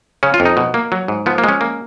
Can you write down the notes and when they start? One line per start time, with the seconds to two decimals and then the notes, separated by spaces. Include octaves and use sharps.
0.23 C#3 C#4
0.34 F4
0.40 F2
0.45 D#4
0.57 B2
0.74 A#3
0.92 F#3
1.08 G#2
1.26 F3 B3
1.38 A#3
1.44 G#3 C#4
1.61 A#3